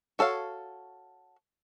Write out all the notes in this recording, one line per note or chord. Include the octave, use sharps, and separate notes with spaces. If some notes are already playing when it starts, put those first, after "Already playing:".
F#4 A4 C#5 F5